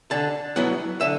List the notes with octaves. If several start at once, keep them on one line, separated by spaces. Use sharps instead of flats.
D3 A5
F#3 B3 E4 F#5
D3 E5